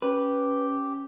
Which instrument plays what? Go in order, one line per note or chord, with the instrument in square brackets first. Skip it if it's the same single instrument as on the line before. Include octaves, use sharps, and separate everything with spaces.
[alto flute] C#4 [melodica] G4 [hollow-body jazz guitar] B4